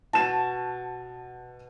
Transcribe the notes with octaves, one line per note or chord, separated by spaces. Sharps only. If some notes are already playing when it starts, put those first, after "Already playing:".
B2 F#4 A5 E7